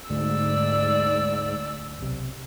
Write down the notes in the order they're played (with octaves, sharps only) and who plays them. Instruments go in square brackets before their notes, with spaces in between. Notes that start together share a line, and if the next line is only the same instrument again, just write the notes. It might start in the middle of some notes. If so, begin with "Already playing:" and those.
[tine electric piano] D2 [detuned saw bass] G#2 [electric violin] D5 E6
[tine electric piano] B1 C3